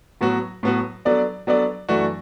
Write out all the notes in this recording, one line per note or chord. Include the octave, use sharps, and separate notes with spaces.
A2 F#3 B3 F#4
A2 F#3 B3 F#4
F#3 B3 D4 A4 D5
F#3 B3 D4 A4 D5
F#2 E3 A3 D4 F#4